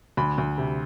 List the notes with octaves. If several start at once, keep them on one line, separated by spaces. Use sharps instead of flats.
D2 B5
D2
C3